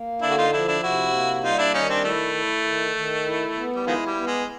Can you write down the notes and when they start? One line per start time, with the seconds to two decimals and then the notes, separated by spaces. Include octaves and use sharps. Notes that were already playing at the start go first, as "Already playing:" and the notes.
Already playing: A#3
0.22 D3 D4 E4
0.30 F#4
0.38 D#4 F4
0.52 F3 D4 E4
0.67 D4 E4
0.83 C3 E4 F#4
1.13 A#3
1.43 G3 D#4 F4
1.58 D4 E4
1.74 D#3 C#4 D#4
1.89 C4 D4
2.04 A3 E4
2.35 E4
2.65 D#3
2.95 D#3
3.25 E4
3.56 B3
3.76 G3
3.87 D#3 F3 G#3 E4
4.07 G3
4.16 B3
4.27 G#3